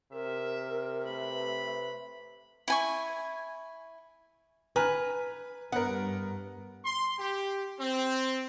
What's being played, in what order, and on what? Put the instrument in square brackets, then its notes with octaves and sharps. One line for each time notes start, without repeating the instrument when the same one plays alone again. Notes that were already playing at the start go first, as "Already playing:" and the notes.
[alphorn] C3 [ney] A#4 [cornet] E5
[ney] A3 [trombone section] B4 [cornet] B5
[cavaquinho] E4 G#5 C#6
[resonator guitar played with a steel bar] B4 [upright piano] G#5 A#5 F6
[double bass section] G2 [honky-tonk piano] B3 A#4 [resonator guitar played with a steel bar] F#5
[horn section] C6
G4
C4